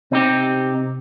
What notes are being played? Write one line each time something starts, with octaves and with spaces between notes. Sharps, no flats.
C3 C4 D#4 G4